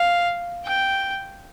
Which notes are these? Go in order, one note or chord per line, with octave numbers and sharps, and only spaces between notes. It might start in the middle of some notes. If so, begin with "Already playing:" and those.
Already playing: F5
G5